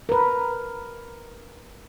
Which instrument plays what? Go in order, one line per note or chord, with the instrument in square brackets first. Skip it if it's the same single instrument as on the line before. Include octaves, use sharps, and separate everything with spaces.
[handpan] A#4 B4